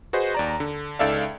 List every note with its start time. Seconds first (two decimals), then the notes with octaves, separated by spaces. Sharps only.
0.13 F#4 G#4 B4 C5 D#5
0.35 D#2 D5 A#5
0.60 D3
0.99 C#2 D#4 A4 D5 E5 F5